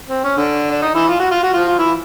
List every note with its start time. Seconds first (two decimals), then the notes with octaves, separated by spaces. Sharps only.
0.09 C4
0.24 C#4
0.37 D3 D4
0.71 D4
0.82 D#4
0.95 E3 E4
1.08 F4
1.20 F#4
1.31 F4
1.43 F#4
1.54 F3 F4
1.68 F4
1.79 E3 E4